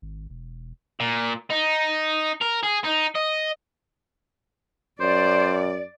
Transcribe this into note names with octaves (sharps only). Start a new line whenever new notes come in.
G#1
E1
A#2
D#4
A#4
G#4
D#4
D#5
F#2 C5 D5